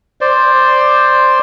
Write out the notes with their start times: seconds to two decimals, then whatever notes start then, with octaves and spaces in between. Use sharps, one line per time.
0.21 C5 D5